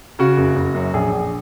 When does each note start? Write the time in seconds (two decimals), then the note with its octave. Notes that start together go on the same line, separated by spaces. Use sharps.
0.19 C#3 F#4
0.37 F#1
0.56 F#1
0.75 F#2
0.93 A#1 G#4
1.12 A#1